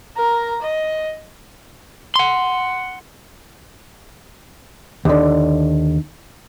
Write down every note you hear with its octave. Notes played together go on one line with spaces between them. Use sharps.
A#4 A#5
D#5
F#5 C6
D#2 D3